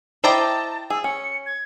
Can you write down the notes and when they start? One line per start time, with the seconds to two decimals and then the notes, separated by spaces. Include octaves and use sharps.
0.24 E4 C5 D5 D#5 G5 A5 A#5
0.90 G#4 E6
1.04 C#4 C#7
1.46 G#6